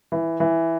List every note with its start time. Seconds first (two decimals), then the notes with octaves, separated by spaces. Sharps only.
0.12 E3
0.40 E3